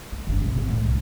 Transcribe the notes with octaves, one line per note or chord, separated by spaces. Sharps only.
A#3
F#1 G2
A#1 C3
G#1
A2 D#3
G1 C2